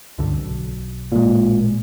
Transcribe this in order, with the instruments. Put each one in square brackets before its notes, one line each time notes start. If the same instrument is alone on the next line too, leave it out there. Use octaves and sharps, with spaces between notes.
[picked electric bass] C#2 G2 D3
B1
[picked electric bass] A1 G#3 [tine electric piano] A#2